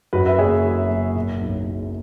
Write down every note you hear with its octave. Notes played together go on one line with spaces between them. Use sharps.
F#2 F#4 B4
B4 E5
F#1 G#4 C#5
F#3
F#1
B2
B1
G#3